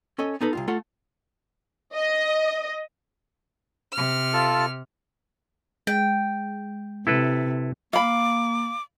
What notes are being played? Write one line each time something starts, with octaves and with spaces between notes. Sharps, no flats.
C#4 A4 C#5 D#5
B3 D#4 A4 B4
C2 F2 F4
A3 F4 A4 F#5
D#5
C3 F6
F4 A4 A5
G#3 G5
C3 E4 A4 B4
A#3 F5 B5 D6